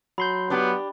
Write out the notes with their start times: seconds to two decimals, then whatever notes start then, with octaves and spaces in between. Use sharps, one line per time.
0.18 F#3 B5 C6 G6
0.50 B3 D4 G4